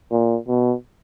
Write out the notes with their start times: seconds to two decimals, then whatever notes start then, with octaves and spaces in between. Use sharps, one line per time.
0.11 A#2
0.48 B2